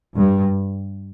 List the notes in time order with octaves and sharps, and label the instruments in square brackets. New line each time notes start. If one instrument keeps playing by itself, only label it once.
[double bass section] G2